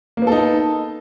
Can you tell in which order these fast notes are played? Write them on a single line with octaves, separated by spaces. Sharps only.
A#3 B3 A4 D#4